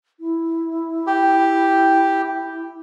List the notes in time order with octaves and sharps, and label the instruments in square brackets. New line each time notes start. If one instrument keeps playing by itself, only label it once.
[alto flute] E4
[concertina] G4